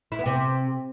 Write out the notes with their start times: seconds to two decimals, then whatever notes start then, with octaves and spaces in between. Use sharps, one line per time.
0.12 E4
0.19 B3
0.26 C3